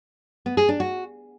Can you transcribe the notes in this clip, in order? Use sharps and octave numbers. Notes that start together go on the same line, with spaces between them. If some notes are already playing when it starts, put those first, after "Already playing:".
B3
G#4
D4
F#4